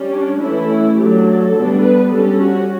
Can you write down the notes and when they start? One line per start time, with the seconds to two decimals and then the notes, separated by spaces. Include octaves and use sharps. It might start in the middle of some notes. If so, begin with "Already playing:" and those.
Already playing: G3 C#4
0.13 D4
0.41 E3 A3 C#4 E4
0.98 F#3 A3 D4 G4
1.26 A4
1.55 D3 G3 B3 D4
1.83 B4
2.12 G3 C#4 A4
2.41 F#4